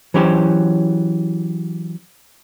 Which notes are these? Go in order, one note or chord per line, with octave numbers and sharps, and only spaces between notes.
E3 F#3 C#4 G4 C5